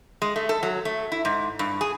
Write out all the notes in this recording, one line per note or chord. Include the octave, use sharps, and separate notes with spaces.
G#3
A3
A4
F#3
A3
E4
G#2
G2
G#4